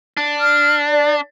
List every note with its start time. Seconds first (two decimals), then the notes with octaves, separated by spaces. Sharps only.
0.17 D4
0.41 F6
0.89 D5